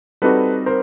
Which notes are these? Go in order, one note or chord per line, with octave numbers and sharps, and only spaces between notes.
G3 C4 D#4 F#4 A4 B4
A#4 C5